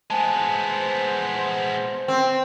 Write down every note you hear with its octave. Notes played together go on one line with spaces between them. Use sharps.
G#3 B3 C5 G#5 A5
C4